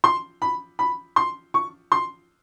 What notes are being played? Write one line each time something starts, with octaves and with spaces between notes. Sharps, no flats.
C6
B5
B5
C6
C#6
C6